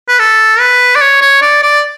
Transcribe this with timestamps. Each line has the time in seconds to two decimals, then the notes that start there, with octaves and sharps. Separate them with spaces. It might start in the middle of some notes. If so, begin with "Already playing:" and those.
0.08 B4
0.19 A4
0.59 B4
0.96 D5
1.01 C#5
1.22 C#5
1.42 D5
1.63 D5